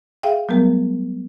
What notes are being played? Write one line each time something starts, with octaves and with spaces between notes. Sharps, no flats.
G#4 E5 F5 G5
F#3 G3 A3 B3 A#4